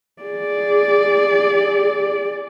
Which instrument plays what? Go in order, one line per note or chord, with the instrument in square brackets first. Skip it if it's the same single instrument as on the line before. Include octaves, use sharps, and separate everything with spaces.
[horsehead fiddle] G#4 D5